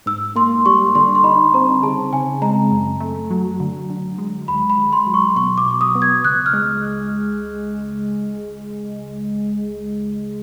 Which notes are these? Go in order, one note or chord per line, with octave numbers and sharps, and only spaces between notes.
G#2 E6
A#3 C6
G3 C#6
D3 C6
C6
D#4 B5
C4 A#5
C#3 A5
C#3 G#5
G#3 A#5
F#2
A3
F#3
D3
D3
G#3
D#2 B5
B5
D#2
C6
F#3
C#6
B2 C#6
D6
B2
D#6
B3
G#6
C#2 F#6
F6
G#3